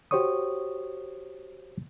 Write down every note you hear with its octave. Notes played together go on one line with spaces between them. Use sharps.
F#4 G4 C5 C#5 C#6 D#6